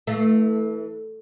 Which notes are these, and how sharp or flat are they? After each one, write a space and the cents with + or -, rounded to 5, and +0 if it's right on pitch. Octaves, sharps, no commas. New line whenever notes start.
E3 -25 A3 +0